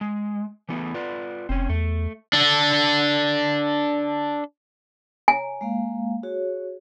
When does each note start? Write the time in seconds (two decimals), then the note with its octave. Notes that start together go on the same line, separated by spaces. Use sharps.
0.01 G#3
0.69 E3 A3 B3
0.94 F4 B4 D5
1.49 F1 C4 C#4
1.69 E2 A3
2.33 D4 A4
5.28 C#5 G#5 A#5
5.61 G#3 A#3 F5
6.23 F#4 G#4 C#5